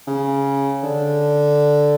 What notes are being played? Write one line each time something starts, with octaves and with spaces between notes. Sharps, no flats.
C#3
D3